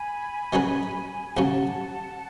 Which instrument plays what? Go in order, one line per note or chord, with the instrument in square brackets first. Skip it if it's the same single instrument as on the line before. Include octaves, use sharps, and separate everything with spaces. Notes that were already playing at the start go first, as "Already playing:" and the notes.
Already playing: [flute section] G#5 B5
[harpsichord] D#3 F#3 C#4 G#4 B4
[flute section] G#5
[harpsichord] D#2 C#3 F#3 C#4 [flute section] F#5 A5